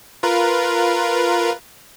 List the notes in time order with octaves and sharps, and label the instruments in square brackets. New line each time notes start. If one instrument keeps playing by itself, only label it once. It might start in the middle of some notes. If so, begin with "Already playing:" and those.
[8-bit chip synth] F4 A#4 B4